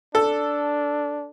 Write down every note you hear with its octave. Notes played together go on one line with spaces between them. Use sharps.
D4 A4